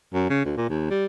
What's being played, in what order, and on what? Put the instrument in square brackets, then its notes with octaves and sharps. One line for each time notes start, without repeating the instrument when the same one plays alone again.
[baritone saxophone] F#2
C#3
D2
A#2
D#2
G3